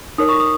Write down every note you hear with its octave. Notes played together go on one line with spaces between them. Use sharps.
D#4 A#4 C#5 D#6
C#6
D#6